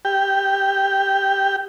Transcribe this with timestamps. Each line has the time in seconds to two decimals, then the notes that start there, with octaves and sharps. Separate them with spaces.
0.05 G4 G5